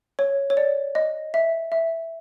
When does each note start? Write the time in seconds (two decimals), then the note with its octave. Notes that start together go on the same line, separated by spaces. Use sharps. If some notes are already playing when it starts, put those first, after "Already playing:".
0.19 C#5
0.50 C#5
0.57 D5
0.95 D#5
1.34 E5
1.72 E5